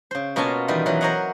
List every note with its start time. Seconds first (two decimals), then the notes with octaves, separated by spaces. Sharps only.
0.11 C#3 C5
0.36 B2 A#3 C#4 F4 G#5 A5
0.68 D#3 E3 G3 F4
0.86 E3 F#3
1.01 A#4 C5 C#5 D#5 F#5